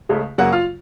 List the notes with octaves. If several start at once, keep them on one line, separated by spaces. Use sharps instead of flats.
C#2 C#3 A3
F#2 C#3 F#3 A#3 F#4 F#5
F4 F5